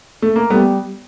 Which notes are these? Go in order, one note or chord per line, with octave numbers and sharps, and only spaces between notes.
A3
A#3
G3 A3 B3